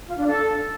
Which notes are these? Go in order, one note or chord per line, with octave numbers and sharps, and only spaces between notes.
F4
D4
A4